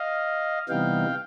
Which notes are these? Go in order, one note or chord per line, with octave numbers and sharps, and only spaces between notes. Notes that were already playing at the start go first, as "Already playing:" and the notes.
Already playing: D#5 F5
C3 E3 G3 B3 D#4 F5 G5